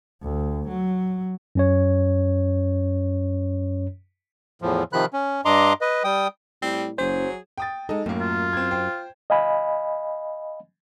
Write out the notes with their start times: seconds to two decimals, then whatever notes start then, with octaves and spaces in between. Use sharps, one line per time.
0.23 D2
0.68 F#3
1.55 F#2 C#4 C#5
4.62 E2 A2 F3
4.93 C3 D#3 F3 B5 F#6
5.13 C#4
5.45 G2 D4 D#5 A#5 C6 D6
5.81 B4 D#5
6.04 G3 G5 D#6
6.62 A2 G3 C4
6.98 F#1 F#3 G#4 C5
7.58 G5 D#6 A6
7.89 G#3 D#4 A4
8.06 F#2 A2 A#3
8.21 F4
8.53 C4 G#6
8.71 C5 G5
9.30 D#5 F5 G#5 B5